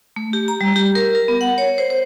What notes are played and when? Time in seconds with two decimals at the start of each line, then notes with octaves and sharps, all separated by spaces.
0.16 A3
0.33 G4
0.48 A#5
0.61 G3
0.76 G4
0.95 A#4
1.15 A#4
1.28 B3
1.41 F#5
1.58 C#5
1.78 C5
1.90 C5